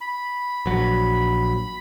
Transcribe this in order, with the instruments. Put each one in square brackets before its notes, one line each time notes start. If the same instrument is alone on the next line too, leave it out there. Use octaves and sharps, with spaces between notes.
[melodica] B5
[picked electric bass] A#1 F#3